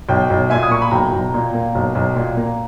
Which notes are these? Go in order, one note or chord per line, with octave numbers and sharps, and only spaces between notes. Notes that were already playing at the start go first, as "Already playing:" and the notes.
B1 G5
B1
A#2 E5 G#5
D#6
A#3 C#6
B5
B1 G5 A#5
B1
A#2
A#3
B1
B1
A#2
A#3